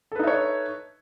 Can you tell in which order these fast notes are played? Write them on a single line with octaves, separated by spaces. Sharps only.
A4 B4 D#4 E5 C#5